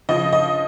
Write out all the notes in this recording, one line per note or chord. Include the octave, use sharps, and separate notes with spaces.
C#3 F3 D#5
D#5